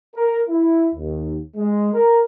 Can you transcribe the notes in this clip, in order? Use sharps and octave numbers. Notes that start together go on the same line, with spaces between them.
A#4
E4
D#2
G#3
A#4